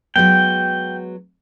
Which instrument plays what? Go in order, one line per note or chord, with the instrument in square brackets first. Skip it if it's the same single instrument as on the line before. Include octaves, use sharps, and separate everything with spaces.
[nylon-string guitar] F#3 G#3 B3 [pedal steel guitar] G5